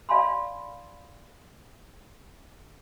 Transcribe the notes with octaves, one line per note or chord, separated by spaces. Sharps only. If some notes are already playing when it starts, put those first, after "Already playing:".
D5 F5 G#5 B5 C6